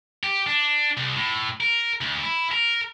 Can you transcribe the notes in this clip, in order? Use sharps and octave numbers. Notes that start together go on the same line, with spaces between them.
G4
D4
C2
A2
A#4
D2
E4
A#4